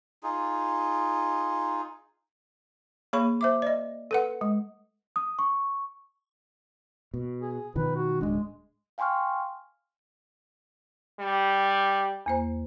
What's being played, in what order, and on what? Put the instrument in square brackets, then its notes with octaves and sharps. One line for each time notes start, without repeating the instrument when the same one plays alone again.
[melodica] D#4 F4 G#4
[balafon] A#3 G#4 C#5 B5 C#6
C5 E5 D6
D5 D#5
A4 B4 F#5
G#3
[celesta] D#6
C#6
[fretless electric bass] B2
[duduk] G#4
[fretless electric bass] B2 D#3 F3 [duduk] B4
[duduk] F#4
[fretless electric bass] D1 G#1 D4 [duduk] G#3
[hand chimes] F5 G5 G#5 C6 C#6 F6
[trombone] G3
[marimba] E2 A#3 C5